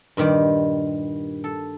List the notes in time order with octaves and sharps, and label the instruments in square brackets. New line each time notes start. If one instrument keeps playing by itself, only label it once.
[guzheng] G2 A#2 D#3 G3
A4